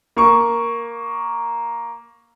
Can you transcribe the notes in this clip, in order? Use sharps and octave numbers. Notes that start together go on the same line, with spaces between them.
A#3 C#6